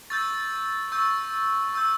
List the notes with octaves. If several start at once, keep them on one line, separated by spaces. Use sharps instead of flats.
C#6 E6 G6 A6
C#6 E6 G6
C#6 E6 G6